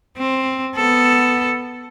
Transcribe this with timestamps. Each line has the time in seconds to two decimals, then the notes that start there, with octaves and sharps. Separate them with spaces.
0.18 C4
0.76 B3 A4